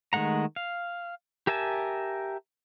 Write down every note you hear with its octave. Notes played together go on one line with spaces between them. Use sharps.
D#3 G#3 A3 F#5 A#5
F5
G4 A#4 E5 G#5 A5